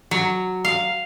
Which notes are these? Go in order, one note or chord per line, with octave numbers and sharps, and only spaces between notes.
F#3
F5